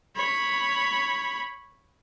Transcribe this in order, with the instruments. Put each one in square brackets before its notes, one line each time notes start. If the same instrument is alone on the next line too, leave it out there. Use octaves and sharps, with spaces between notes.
[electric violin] C#5 B5